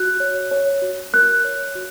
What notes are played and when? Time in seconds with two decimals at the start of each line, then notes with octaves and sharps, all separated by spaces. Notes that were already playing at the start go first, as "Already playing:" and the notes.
Already playing: F#4 F#6
0.20 C#5
0.51 C#5
0.82 F#4
1.13 A#4 F#6
1.44 C#5
1.75 F#4